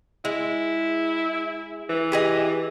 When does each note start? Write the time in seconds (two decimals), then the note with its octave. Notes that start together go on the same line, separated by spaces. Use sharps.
0.25 G#3 E4
1.89 E3
2.12 G4 G#4 D#5